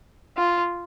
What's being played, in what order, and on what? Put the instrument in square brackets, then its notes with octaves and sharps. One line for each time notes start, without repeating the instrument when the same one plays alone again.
[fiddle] F4